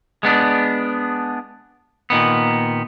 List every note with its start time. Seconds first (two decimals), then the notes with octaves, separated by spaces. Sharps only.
0.23 G#3 B3 D4
2.10 A#2 D#3 B3